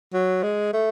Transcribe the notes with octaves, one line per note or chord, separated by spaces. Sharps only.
F#3
G#3
A3